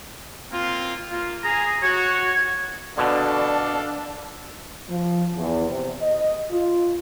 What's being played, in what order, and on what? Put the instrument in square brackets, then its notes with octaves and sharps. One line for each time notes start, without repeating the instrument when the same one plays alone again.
[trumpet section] A#3 C4 F4
A#3 F4
[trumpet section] G#4 [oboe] A#5
[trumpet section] F#4 [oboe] C#5
[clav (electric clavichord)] B2 D3 [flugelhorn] D4 [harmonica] A4 F5 [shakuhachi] D5
[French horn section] F3
E2
C3
D#5
F4